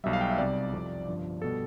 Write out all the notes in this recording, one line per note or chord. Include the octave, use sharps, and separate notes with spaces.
B1 B2 G3 E5
F5
G5
E5
C2 C3 G3 D5
F2 C3 F3
G1 G2 F3
B2 G3 A4